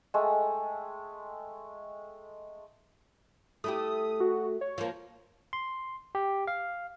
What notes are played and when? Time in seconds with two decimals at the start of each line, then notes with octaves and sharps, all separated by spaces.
0.14 G#3 A3 A4 G5
3.64 A3 E4 G4 D#6
4.20 F#4
4.61 C#5
4.78 F3 A#3
5.53 C6
6.15 G4
6.47 F5